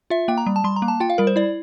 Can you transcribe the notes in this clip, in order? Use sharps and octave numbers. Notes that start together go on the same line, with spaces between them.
F4 E5
A#3 G5
A#5
G3
A5
G3 C6
A#5
A#3
A5
F4 G5
F5
G3 A#4
C5
E4 D5